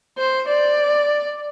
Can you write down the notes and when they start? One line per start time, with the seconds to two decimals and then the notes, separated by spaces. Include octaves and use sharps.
0.18 C5
0.48 D5